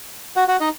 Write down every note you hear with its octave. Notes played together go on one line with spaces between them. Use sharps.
F#4 F#5
F#4 F#5
D#4 D#5